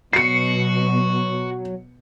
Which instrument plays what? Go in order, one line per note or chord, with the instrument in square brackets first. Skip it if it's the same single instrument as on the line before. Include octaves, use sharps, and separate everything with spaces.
[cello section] B2 [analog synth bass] F#3 [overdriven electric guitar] F#4 [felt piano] C7 C#7